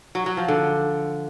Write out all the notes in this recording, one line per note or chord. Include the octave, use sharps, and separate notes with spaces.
F#3
F#3
F3
D3